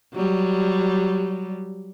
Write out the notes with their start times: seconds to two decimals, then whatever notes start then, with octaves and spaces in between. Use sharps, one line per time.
0.14 F#3 G3